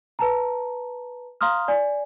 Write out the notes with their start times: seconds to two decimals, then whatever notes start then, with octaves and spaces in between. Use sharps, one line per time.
0.19 B4 A5 A#5
1.41 F5 A#5 C6 D#6 F6
1.68 D5 G#5